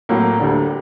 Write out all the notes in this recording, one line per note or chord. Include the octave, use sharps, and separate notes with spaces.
A2 F#3 A#3
D2 D3 G3